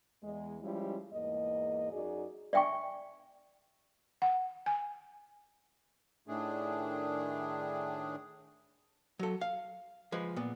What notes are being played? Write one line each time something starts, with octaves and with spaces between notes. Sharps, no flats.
E2 G#3
F3 G3 G#3 C#4 E4
E2 G#2 A#3 D#5
F#2 D#4 F#4 G#4 D5
D5 E5 G5 G#5 C#6
F#5
G#5
A2 D#3 A3 D4 G#4
F#3 A4
F5
F3 G#3 B4
A#2 B3